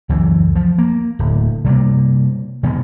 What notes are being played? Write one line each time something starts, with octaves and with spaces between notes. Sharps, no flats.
C#2 F#2 E3
F3
A#3
D1
C3 G3 A3 A#3
B2 D#3 G#3